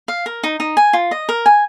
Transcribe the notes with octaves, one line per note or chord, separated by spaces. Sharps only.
F5
A#4
D#4
D#4
G#5
F4
D#5
A#4
G#5